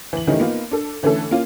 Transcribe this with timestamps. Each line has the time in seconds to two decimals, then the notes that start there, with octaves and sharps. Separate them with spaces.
0.13 E3 F#7
0.27 D#3 E3 G3 A3 C#4 D#4
0.40 A#3 B3 D#4 F4
0.71 D4 A4
1.03 D3 E3 A3 C#4 A4
1.31 A#3 C#4 F4